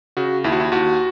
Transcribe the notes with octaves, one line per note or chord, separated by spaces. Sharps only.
C#3 F#4
D#2 E4
F#4
E4
D#2 F#4